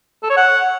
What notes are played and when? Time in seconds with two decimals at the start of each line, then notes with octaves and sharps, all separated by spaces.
0.23 A4
0.30 C#5
0.37 F#5